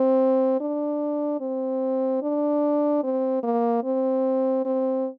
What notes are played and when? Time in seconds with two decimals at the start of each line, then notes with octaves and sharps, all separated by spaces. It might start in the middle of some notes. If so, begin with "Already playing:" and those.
Already playing: C4
0.60 D4
1.41 C4
2.22 D4
3.03 C4
3.43 A#3
3.84 C4
4.65 C4